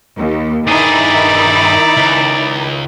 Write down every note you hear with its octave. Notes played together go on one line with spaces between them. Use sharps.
D#2
G2 D#3 D#4 E4 G#4 D5
C#2